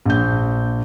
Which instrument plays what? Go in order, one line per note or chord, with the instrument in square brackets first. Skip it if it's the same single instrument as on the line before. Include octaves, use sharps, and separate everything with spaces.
[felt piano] A#1 G6